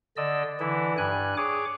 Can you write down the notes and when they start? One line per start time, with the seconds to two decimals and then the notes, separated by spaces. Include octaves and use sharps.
0.17 D3 D5 D#5 E6
0.60 D3 E3 E4
0.98 G2 G#5 F#6
1.37 G#4 C#5 D6